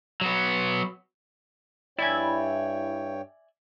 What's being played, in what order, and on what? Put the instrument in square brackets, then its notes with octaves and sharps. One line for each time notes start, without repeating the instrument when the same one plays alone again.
[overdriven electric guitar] F#3 B3
[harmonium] G2 C#5 G5 [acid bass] E4 [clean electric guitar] D5 E5 G#5